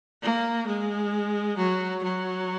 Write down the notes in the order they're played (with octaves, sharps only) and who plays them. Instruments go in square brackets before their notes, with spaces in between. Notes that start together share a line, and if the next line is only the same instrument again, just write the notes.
[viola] A#3
G#3
F#3
F#3